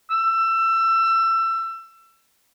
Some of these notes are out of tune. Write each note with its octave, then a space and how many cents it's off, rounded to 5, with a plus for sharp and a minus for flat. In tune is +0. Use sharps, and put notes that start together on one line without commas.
E6 +25